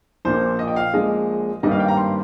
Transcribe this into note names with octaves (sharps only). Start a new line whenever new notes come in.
A#1 A#2 F3 A#3 C5
D#5
G5
F5
A#1 A#2 G#3 D#5
G#1 G2 G3 A#3 D#5
F5
G5
A#5
C6